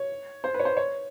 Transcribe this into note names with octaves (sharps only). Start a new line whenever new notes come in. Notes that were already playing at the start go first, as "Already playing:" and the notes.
Already playing: C#5
C5
B4
C#5
C5
C#5